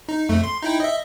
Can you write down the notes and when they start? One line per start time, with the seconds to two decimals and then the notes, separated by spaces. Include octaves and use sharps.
0.09 D#4
0.29 F2 A3
0.44 C6
0.63 D#4 E4 G5
0.80 D#5 E5